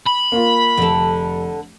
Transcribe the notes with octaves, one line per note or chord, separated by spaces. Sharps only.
B5
A#3 F4
F1 D3 A4